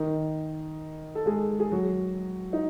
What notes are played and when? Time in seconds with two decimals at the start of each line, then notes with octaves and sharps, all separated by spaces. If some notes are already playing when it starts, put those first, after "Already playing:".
Already playing: D#3 D#4
1.15 A4
1.26 G#3 G#4
1.60 G#4
1.72 F#3 F#4
2.53 D#4